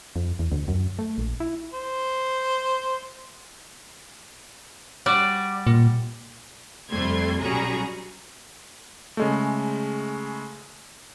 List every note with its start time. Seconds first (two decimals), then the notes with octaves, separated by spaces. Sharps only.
0.16 F2
0.39 E2
0.52 D2
0.68 F#2
0.99 A3
1.18 A#1
1.40 E4
1.73 C5
5.06 G3 F#4 D5
5.67 A#2
6.91 F2 C3 G3 A3 C6 G#6
7.40 B1 G3 C#4 F#4 G#4 A#5
9.17 C#3 G#3 A3